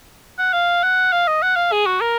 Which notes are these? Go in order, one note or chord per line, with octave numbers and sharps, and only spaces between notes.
F#5
F5
F#5
F5
D#5
F#5
F5
G#4
F#4
A#4